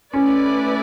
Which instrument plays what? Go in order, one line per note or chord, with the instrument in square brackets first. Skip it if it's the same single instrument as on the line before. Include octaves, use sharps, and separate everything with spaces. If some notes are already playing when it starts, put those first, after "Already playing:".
[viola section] A3 E4 B4 D5 [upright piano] C#4